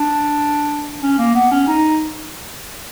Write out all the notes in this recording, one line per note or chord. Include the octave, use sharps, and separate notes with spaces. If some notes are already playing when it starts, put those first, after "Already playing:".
Already playing: D4
C#4
A#3
B3
C#4
D#4